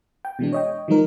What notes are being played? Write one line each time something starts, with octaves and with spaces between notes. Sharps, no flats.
G5
B2 E3 G#3 D4
C#5 D#5 G5
D#3 F3 G#3 D#4 A#4